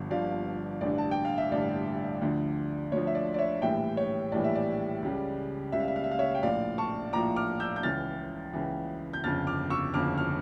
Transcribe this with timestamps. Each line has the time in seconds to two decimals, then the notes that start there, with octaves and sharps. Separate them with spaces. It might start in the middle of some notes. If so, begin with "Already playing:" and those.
Already playing: G1 G2 D3 F3
0.10 G1 G2 D3 F3 D5 F5
0.81 A1 G2 D3 D5
0.98 A5
1.11 G5
1.25 F5
1.38 E5
1.51 A1 G2 D3 D5
2.22 D2 D3 F3
2.92 D2 D3 F3 C#5
3.07 E5
3.15 D5
3.34 D5
3.39 C#5 E5
3.62 A#1 A2 E3 G3 E5 G5
3.97 C#5
4.32 A#1 A2 E3 G3 D5
4.44 E5
4.55 D5
5.02 C#2 C#3 G3
5.72 C#2 C#3 G3 E5
5.80 F5
5.88 E5
5.96 F5
6.04 E5
6.11 F5
6.19 C#5 E5
6.35 G5
6.43 A#1 A2 F3 D5 F5
6.78 A5 C#6
7.13 A#1 A2 F3 A#5 D6
7.36 D6 F6
7.60 E6 G6
7.76 G6
7.83 C#2 C#3 E3 F6 A6
8.53 C#2 C#3 E3
9.13 G6
9.24 G1 F2 C#3 F6 A6
9.47 D6 F6
9.70 C#6 E6
9.94 G1 F2 C#3 D6 F6
10.18 F6